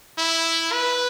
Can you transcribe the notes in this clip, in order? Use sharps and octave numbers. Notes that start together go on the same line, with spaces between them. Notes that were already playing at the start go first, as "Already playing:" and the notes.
E4
B4